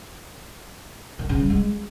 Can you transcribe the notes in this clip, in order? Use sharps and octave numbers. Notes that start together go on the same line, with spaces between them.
D#3
C#3
G3
G#3